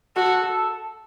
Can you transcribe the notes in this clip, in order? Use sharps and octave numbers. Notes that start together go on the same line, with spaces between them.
F#4 A4
A4